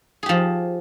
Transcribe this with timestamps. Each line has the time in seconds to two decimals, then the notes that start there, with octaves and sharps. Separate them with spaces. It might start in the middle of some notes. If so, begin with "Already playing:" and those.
0.23 G#4
0.26 G4
0.29 F3